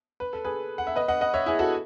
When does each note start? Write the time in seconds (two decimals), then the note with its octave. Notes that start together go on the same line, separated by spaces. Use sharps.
0.20 B4
0.33 A4
0.45 G#4 B4
0.78 F#5
0.87 E5
0.96 B4 D#5
1.08 D#5 F#5
1.21 D#5 F#5
1.34 C#5 E5
1.46 E4 G#4
1.59 F#4 A4